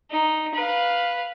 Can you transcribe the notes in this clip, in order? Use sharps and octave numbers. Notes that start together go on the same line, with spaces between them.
D#4
B4 F5